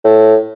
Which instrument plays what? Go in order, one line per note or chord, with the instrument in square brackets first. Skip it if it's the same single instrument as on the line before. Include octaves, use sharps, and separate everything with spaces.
[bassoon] A2